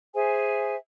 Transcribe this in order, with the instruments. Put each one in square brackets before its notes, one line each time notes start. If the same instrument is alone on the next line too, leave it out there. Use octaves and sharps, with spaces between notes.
[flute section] G#4 C5 E5 G#5